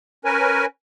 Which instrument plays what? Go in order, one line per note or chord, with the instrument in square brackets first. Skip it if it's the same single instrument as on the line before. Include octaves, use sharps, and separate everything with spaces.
[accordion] C#4 A#4 B4 G#5